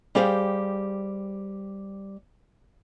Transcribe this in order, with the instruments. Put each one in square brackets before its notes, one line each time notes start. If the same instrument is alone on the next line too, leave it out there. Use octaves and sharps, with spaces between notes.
[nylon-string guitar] G3 G4 G#4 C5 F5